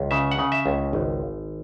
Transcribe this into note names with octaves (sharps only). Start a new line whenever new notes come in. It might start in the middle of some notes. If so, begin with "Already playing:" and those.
Already playing: C#2
C#3 E5
F#5
C#3
E5
C#2
G#1